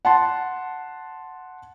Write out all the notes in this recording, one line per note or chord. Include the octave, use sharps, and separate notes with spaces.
F#5 A5 C6